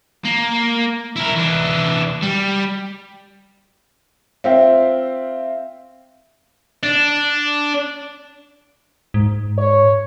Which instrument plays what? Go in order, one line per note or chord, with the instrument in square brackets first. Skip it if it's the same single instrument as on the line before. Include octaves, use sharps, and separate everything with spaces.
[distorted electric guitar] A#3
E4 A#4
E3 D4
G3
[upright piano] C4 F4 E5 F5 G5
[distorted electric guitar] D4
[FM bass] G#2
[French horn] C#5